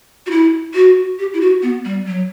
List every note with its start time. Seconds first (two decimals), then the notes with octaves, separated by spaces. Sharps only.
0.26 F#4
0.31 E4
0.74 F#4
1.19 G4
1.34 E4
1.41 F#4
1.63 B3
1.85 G3
2.07 F#3